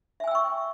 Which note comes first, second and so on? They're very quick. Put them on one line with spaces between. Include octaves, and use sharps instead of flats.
E5 G#5 E6 G5 C#6